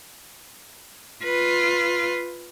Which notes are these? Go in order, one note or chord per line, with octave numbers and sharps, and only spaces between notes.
F4 B4